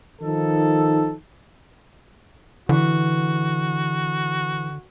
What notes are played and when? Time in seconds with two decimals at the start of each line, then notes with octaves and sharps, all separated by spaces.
0.22 D#3 F3 D#4 A4
2.69 D3 E3 F#4